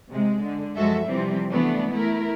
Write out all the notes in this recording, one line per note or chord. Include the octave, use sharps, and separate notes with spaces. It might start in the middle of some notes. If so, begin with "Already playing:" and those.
C3 G#3
D3
F#2 F3 G#3 F#4 A4 E5
C3 E3 F3 G3 C4
E3 A3 B3 D4
A3 E4 A#4